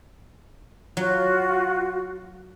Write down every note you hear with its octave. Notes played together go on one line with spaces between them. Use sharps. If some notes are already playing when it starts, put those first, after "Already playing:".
F#3 F4 F#4